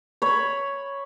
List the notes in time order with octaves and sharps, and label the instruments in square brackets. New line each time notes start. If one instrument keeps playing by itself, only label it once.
[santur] C#5 B5